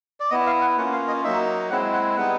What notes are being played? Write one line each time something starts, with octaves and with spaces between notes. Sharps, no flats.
D5
B3 E4 D#5
F5
F#5
A#3 C#4 F4 F#5
F5
D#5
F#3 A#3 D#4 E5
G#3 C4 E4 F#5
F#5
G3 B3 D#4 F#5